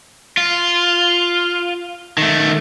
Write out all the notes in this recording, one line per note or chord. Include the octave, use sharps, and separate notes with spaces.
F4
D#3 A3